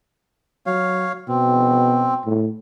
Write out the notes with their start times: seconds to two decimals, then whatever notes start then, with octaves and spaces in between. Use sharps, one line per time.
0.66 F#3 C#5 F5
1.28 B2 C4
2.26 A2